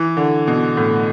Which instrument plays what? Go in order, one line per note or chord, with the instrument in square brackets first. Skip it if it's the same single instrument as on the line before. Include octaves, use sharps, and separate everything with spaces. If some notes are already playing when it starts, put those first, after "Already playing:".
Already playing: [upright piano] E3
D3
B2
A2